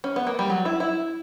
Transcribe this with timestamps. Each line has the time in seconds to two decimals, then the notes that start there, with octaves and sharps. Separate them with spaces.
0.04 C#4
0.16 B3
0.27 A#3
0.39 G3
0.50 F#3
0.65 E4
0.80 E4